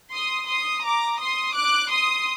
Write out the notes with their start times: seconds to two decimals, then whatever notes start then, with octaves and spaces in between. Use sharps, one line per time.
0.12 C6 D#6
0.48 C6 D#6
0.84 A#5 D6
1.20 C6 D#6
1.55 D6 F#6
1.91 C6 D#6